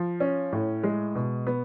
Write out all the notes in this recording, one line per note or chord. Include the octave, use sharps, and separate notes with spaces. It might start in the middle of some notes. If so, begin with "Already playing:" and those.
Already playing: F3
C#4
A2
G#3
B2
B3